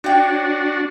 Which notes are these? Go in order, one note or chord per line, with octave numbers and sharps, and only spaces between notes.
D4 F#4 C#5 G5